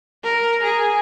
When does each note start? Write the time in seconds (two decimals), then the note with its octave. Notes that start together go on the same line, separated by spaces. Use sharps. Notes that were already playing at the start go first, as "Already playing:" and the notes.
0.23 A#4
0.63 G#4